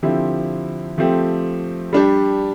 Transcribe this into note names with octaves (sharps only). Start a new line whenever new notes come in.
D3 F3 C4 E4 G4
F3 A3 C4 G4
G3 D4 G4